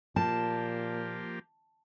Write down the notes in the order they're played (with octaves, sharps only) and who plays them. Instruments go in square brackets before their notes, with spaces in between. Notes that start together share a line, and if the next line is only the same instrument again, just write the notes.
[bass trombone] A#2 [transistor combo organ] F3 A#3 G4 [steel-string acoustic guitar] A5